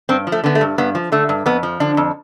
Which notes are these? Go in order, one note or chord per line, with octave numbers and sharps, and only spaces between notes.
G2 C4
F3
A3
D3 B3
A3
G2
G2 B3
F3
D3 A3
G2
F2 B3
F3
D3 D4
F2